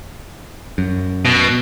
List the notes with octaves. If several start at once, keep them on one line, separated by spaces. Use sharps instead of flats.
F#2
B2